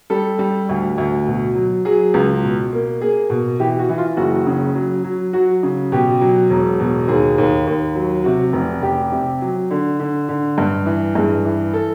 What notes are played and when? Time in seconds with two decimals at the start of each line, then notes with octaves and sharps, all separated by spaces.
0.10 G3 A4
0.39 G3
0.69 D2
0.98 D2
1.27 B2
1.55 F#3
1.85 F#3 G#4
2.14 C#2
2.43 B2
2.73 A#3
3.01 A#3 G#4
3.30 B2
3.60 E3 G4
3.79 F#4
3.89 E3
3.98 F4
4.17 F#1 F#4
4.47 C#3
4.75 F#3
5.04 F#3
5.33 F#3 F#4
5.63 C#3
5.92 B2 G4
6.21 F#3
6.50 E1
6.80 B2
7.08 D#2 G#4
7.38 D#2
7.67 D#2
7.95 F#3
8.24 C3 F#4
8.53 F1
8.82 F1 G4
9.12 C3
9.42 F#3
9.71 D3
9.99 D3
10.29 D3
10.58 G2
10.86 E3
11.15 G2 G#4
11.45 E3
11.74 A4